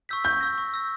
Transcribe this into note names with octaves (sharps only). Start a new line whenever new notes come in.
C#6 E6 G6 B6
C#6 G6
E6 A#6
C#6
E6 A#6